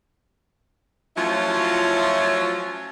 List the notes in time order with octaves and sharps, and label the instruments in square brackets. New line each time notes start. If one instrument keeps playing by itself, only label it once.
[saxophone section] F3 F#3 A3 C#4 E4 F4